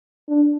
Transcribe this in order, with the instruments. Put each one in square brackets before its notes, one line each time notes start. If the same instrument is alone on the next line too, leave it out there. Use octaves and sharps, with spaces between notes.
[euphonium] D4